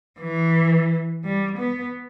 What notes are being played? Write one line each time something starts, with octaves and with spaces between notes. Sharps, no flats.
E3
G3
B3